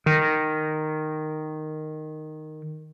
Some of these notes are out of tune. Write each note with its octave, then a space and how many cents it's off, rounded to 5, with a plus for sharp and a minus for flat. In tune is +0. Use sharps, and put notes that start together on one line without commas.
D#3 -10